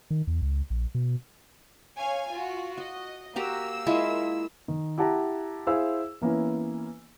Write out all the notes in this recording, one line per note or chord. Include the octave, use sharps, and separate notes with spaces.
D#3
E2
C#2
A#1
B2
C#5 F5 G#5
F4 F#4
F#4 D#5
A#3 F#4 G4 A#5 E6
G#3 E4 F4
D#3
E4 G4 F#5 A5 A#5
E4 G#4 C5 F5 E6
E3 A#3 B3 C#4 E4